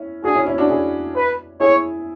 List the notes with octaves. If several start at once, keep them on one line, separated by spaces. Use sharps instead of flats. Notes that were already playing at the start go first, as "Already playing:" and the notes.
Already playing: C#4 E4
D4 F#4 G#4
C#4 E4
C#4 E4
D4 F#4
E4 G#4
B4
E4 G#4 C#5